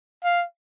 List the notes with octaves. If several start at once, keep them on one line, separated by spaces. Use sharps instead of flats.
F5